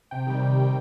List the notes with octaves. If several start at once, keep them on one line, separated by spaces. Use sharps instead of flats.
C3 G5
D#3 G3
C3
D#3 G3